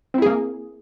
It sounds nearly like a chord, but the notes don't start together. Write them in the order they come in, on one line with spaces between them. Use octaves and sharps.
C4 E4 G#4 A#3